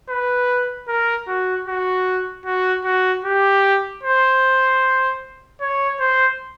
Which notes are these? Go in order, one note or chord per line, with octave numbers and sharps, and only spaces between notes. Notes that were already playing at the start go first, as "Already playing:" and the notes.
B4
A#4
F#4
F#4
F#4
F#4
G4
C5
C#5
C5